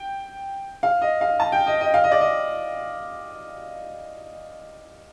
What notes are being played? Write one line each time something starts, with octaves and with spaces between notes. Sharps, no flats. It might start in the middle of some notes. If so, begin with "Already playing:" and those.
Already playing: G5
F5
D#5
F5
A5
G5
D#5
D#5
F5
D#5
D5
D#5